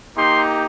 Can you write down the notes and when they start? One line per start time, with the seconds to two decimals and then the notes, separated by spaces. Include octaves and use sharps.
0.16 A#3 D#4 G4 C6